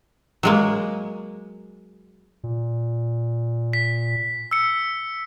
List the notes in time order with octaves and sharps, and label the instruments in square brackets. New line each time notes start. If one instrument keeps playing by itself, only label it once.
[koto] F#3 G#3 A#3
[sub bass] A#2
[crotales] B6
E6 C#7